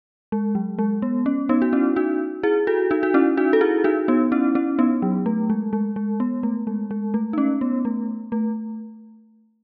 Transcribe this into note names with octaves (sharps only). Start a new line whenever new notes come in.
G#3
F#3
G#3
B3
C#4
B3 D#4
F#4
C#4 E4
D#4 F#4
E4 G#4
F#4 A4
D#4 F#4
F#4
C#4 E4
D#4 F#4
A4
E4 G#4
D#4 F#4
B3 D#4
C#4 E4
C#4 E4
B3 D#4
F#3
A3
G#3
G#3
G#3
B3
A3
G#3
G#3
A3
D#4
C#4
B3
A3
A3